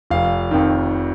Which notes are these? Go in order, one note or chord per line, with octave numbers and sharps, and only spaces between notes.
F1 F5
F2 D#3